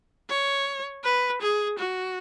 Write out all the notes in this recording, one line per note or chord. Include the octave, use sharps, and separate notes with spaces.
C#5
B4
G#4
F#4